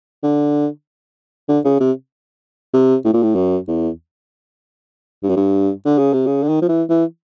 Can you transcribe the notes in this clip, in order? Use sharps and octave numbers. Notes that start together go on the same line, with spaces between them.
D3
D3
C#3
C3
C3
A2
A#2
A2
F#2
E2
G2
F#2
G2
D3
C#3
C3
C#3
D3
D#3
F3
E3
E3